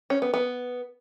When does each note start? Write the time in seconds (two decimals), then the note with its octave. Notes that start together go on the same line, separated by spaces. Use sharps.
0.10 C#4
0.22 B3
0.34 B3